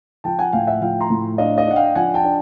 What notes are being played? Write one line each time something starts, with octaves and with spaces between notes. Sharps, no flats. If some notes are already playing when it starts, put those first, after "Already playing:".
F3 G5 A5
F#5 G#5
A2 F5 G5
E5 F#5
F3 F5 G5
A#5 C6
A2
D4 D#5 F5
D#5 F5
D4 F#5
F5 G5
F3 F#5 G#5
G5 A5
D4